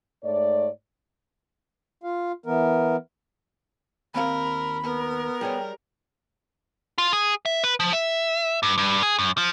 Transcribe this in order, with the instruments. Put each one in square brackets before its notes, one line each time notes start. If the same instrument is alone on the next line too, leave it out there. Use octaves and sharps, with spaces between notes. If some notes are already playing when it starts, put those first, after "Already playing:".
[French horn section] G#2 A3 C#5 D5
[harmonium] F4 F5
E3 B3 A#4
[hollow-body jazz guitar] D#2 C4 F5 [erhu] A#4 [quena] B5
[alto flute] B3 [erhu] A#4
[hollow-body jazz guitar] G3 G#4 C#5 [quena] G5
[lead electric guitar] F4
G#4
E5
B4
F3
E5
G2
G2
G#4
F#2
F3